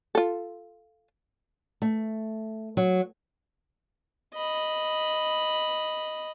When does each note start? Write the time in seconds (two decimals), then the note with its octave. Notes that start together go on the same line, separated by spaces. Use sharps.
0.15 F4 A4
1.82 A3
2.77 F#3
4.35 D#5 B5